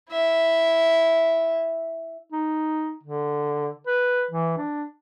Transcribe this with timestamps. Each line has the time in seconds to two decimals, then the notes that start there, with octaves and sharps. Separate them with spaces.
0.11 E4 E5
2.31 D#4
3.03 D3
3.87 B4
4.31 E3
4.57 D4